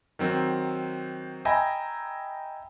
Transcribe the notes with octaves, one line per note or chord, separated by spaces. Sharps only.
D#3 F#3 C4
D#5 E5 G5 G#5 A#5 B5